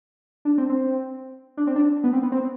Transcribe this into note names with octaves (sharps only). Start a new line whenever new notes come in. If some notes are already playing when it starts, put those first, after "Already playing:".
D4
C4
C4
D4
C4
D4
B3
C4
B3
C4